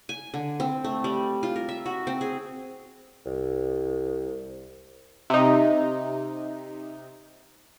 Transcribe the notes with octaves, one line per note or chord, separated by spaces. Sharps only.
G#5
D3
C4
A3
G3
F4
A#4
E5
F#4
C4
G#4
C2
C3 D#4